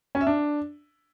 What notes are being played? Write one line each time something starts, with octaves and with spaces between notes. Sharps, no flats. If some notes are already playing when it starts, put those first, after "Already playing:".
C#4
E5
D4